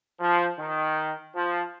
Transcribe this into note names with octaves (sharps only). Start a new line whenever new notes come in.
F3
D#3
F3